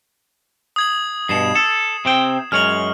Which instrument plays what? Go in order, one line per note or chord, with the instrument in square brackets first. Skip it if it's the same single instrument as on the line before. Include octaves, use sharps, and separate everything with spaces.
[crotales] D#6 G#6 F#7
[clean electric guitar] G2 B2 [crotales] C7 E7
[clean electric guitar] A4
C3 C4 G5
[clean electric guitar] F#2 G#3 C#5 [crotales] F6 F#7